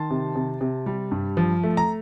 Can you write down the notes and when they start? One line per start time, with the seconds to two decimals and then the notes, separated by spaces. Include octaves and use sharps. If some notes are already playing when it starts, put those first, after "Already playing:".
Already playing: D#3 A5 C6
0.10 C3
0.36 C3
0.61 C3
0.86 G3
1.11 G2
1.37 F3
1.63 A3
1.77 A#5